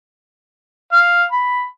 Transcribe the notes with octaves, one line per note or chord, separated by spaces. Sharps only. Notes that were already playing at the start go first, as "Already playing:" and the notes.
F5
B5